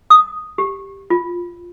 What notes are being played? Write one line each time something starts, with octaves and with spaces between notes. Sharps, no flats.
D#6
G4
F4